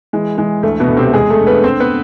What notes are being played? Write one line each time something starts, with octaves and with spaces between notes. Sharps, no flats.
E3 G#3
E3 G#3
D2 A3
B2 B3
D2
C3 C4
E2 G#3 G#4
A3 A4
D3
B3 B4
D3 C4 C5
B3 B4